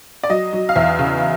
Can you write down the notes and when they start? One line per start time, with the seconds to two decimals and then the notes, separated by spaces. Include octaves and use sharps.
0.23 D5
0.29 F#3 D#5
0.53 F#3
0.69 F5
0.76 E2 E5
0.99 C#3